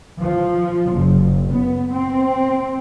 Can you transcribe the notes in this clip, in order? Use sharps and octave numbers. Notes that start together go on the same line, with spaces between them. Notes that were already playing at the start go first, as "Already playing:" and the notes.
F3
F#1
B3
C4